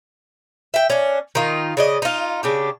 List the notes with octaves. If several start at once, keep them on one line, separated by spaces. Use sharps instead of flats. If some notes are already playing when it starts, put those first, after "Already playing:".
E5 G5
C#4 D4
D#3 D#4 F4
C#3 D5 D#5
D#4 F4
C#3 D4 G4